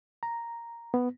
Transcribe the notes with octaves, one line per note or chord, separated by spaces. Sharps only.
A#5
B3